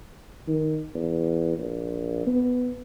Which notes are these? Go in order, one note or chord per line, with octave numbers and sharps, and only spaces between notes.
D#3
E2
A#1
B3